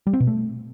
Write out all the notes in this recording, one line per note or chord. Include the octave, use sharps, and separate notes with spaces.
G3
C4
B2
A3